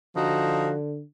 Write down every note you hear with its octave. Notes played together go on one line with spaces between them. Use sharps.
D3 F3 D#4 F#4